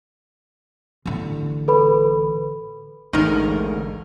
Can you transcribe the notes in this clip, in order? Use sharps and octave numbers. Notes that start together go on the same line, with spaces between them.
A1 D3
A4 B4 B5
A1 D2 G#2 D#3 D#4 A#4